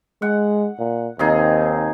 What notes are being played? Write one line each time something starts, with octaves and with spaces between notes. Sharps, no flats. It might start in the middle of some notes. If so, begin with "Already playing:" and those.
G#3 F#5
A#2
D#2 C3 D#4 G#4